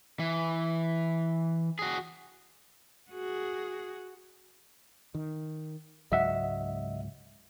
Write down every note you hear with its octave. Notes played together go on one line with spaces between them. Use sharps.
E3
F#4 G#4
F#4 G#4
D#3
C#2 G#2 F#3 D#5 E5 F#5